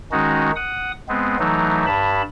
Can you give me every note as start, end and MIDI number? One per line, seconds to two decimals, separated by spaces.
0.12 0.51 51
0.12 0.51 56
0.12 0.51 61
0.12 0.51 63
0.12 0.51 66
0.56 0.92 78
0.56 0.92 87
1.09 1.37 56
1.09 1.37 59
1.09 1.37 60
1.39 1.86 52
1.39 1.86 54
1.39 1.86 57
1.39 1.86 63
1.87 2.22 43
1.87 2.22 81
1.87 2.22 83